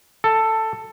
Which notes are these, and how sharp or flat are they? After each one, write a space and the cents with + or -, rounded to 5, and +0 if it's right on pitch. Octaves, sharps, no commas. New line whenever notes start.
A4 +10